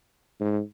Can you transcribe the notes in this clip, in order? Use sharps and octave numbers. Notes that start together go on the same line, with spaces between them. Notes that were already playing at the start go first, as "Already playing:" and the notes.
G#2